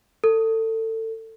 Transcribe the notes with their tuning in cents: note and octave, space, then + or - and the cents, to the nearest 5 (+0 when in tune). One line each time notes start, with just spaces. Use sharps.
A4 +25